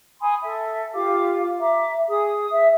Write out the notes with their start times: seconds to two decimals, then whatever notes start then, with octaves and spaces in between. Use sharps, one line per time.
0.21 G#5 B5 C6 D#6
0.43 A4 E5
0.94 F4 G4 F5 D6
1.59 E5 A#5 D6
2.09 G#4 D#6
2.51 E5